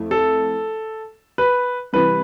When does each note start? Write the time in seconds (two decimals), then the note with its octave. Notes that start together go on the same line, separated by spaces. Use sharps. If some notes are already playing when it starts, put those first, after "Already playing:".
Already playing: F2 A3 E4
0.11 A4
1.38 B4
1.93 C3 E3 G3 B4